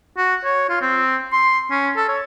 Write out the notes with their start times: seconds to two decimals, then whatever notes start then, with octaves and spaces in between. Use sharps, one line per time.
0.18 F#4
0.45 C#5
0.70 F4
0.81 C4
1.32 C6
1.71 C#4
1.97 A4
2.09 C#5